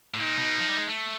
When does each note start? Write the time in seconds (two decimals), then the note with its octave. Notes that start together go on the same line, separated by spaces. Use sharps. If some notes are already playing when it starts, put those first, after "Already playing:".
0.14 A2
0.19 A#2 D#4
0.38 B2
0.58 F3
0.68 G3
0.77 G#3
0.87 A3